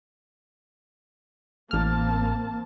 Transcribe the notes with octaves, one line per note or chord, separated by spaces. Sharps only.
A1 A#3 C4 A5 F6